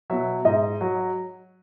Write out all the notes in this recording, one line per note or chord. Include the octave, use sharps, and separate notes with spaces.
B2 F#3 E5
G#2 D#5
F#3